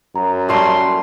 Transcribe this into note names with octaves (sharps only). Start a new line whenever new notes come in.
F#2 A#5
G3 A3 A#3 C6 C#6